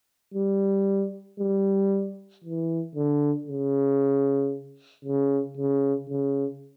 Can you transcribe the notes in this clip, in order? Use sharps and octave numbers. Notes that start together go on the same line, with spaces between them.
G3
G3
E3
D3
C#3
C#3
C#3
C#3